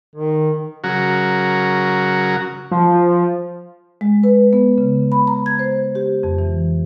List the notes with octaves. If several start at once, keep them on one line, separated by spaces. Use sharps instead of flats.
D#3
C#3 F#3 F#4 A#4
F3
G#3
B4
B3
C#3
B5
A#5
G#6
C5
G4
F2
E3